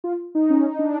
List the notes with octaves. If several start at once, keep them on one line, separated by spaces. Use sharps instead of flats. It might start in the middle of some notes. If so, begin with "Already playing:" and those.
F4
D#4
C#4
D#4
D4